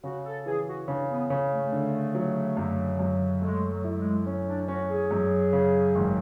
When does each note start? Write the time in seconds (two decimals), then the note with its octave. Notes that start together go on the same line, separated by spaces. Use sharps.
0.03 C#3 F#4
0.24 A4
0.45 E3 G#4
0.67 F#4
0.87 C#3 D4
1.09 B3
1.30 C#3
1.52 A3
1.72 D3
2.15 F#3
2.57 F#2
2.99 F#2
3.41 G#3 A3
3.69 F#3
3.84 E4
3.97 G#3
4.26 C#4
4.47 D4
4.68 C#4 F#4
4.89 G#4
5.11 F#2
5.53 C#3
5.95 G#1